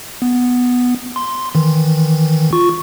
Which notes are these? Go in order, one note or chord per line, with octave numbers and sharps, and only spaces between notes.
B3
C6
D#3 E3
F4 C#6